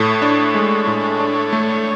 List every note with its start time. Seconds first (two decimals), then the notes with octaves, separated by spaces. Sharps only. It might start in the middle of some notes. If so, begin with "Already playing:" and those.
Already playing: A2 A4 C#5
0.22 D4
0.55 G#3
0.87 A2
1.20 D4
1.53 A3